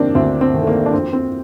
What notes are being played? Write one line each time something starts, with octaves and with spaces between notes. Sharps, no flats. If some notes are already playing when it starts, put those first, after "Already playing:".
Already playing: C3 D#3 A#3 C4 D4
D2 C4
C4
C3 D#3
A3
A#3
D4
F2 C4
C4